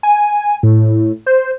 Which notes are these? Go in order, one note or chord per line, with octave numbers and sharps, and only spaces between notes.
G#5
A2
C5